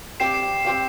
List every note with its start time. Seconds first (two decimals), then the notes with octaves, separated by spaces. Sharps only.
0.20 C4 G4 D5 F5 C7 E7
0.34 C7 E7
0.65 C4 G4 D5 F5